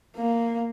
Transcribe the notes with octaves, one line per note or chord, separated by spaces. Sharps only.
A#3